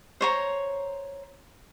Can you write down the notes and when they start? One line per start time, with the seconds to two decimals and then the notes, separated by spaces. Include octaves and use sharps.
0.21 C5 C#5 A#5